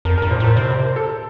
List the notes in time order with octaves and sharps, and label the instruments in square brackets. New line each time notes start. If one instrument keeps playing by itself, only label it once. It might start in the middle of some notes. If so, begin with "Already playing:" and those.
[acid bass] F2 [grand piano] A#4
[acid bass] G2 [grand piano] A#4
[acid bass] A#2 [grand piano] C5
[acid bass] A2 [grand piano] A#4
[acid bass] C3 [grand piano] C5
[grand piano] C5
A#4
A4
A4